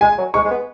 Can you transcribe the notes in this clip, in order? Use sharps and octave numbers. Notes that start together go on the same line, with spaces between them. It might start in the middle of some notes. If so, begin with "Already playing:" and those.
G#3 G#5
F#3
G#3 C#6
G#3
B3